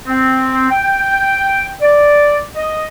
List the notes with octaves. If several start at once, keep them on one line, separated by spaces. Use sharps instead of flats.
C4
G5
D5
D#5